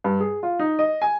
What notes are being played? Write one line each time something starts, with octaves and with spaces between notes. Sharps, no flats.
G2
G#4
F4
D#4
D#5
G#5